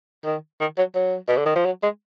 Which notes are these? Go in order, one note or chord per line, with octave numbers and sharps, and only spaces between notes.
D#3
D#3
F#3
F#3
B2
D3
D#3
F3
F#3
G#3